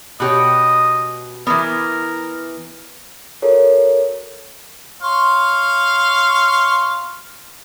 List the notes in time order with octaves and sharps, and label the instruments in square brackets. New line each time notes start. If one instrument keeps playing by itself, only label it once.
[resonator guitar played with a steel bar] B2 G4 C#5 [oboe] D#5
[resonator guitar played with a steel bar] E3 B3 [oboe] A#4
[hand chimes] F#4 A4 A#4 C#5
[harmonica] C#5 F5 C6